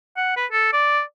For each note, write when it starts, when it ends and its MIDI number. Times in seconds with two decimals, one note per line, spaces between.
0.17 0.35 78
0.37 0.46 71
0.52 0.69 69
0.73 1.01 74